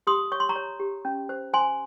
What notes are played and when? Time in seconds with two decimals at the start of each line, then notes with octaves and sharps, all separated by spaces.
0.07 G4 C6 D#6
0.32 C#5 C#6
0.40 C6
0.49 A#5 C#6
0.56 C#5
0.79 G4
1.05 C#4
1.29 C5
1.53 C5 G#5 C6